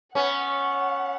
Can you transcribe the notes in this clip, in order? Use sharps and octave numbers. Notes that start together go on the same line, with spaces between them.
B3 C#4 F#5